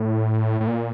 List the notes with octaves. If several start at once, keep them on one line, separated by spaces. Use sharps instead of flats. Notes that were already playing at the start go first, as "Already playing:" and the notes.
Already playing: A2
A2
A#2